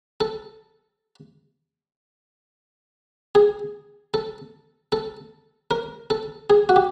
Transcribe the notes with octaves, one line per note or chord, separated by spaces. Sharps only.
A4
G#4
A4
A4
A#4
A4
G#4
F#4
G4